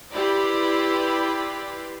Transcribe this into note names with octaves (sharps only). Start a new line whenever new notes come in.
E4 G4 B4 D5 B5 C6